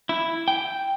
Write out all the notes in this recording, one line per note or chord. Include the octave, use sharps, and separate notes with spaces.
E4
G5